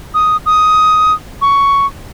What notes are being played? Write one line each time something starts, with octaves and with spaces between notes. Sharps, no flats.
D#6
D#6
C#6